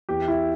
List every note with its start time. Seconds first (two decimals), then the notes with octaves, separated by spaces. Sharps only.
0.09 E2 G4
0.28 E4